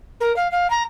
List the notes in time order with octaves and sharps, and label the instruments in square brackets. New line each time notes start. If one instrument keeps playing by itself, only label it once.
[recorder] A#4
F5
F5
A#5